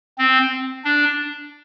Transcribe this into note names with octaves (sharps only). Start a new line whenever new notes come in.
C4
D4